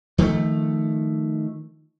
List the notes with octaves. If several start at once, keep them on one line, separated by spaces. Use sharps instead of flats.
D#3 F3 G#3 A3